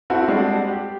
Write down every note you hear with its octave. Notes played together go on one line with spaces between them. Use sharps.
C4 E4 F#4 A4
G3 G#3 C4 D4 F#4
G4